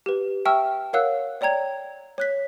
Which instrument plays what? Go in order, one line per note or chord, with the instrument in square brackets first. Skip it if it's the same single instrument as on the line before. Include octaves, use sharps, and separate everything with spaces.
[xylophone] G4 B4
E5 G5 A5 C#6 E6 F6
A#4 C#5 F5 F#5 E6 F#6
C#5 D5 G5 A#5 G#6
C#5 F#6 B6